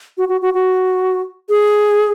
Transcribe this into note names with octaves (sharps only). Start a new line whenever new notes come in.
F#4
F#4
F#4
F#4
G#4